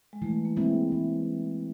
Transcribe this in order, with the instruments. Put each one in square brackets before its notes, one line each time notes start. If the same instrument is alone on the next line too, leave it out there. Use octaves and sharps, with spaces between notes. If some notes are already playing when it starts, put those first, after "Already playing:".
[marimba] G#3
[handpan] E3 [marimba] A3
[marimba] A#3
[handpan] G#3 C4 E4
E3